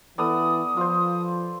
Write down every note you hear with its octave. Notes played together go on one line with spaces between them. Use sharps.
E3 B3 A4 D5 D#6
F3 F4 C5